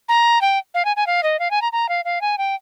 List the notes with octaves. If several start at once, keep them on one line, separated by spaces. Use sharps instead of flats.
A#5
G5
F5
G#5
G#5
F5
D#5
F5
G#5
A#5
A#5
F5
F5
G#5
G5